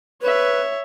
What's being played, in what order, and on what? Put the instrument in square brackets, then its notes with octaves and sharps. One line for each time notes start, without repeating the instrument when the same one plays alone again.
[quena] B4 [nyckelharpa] C#5 E5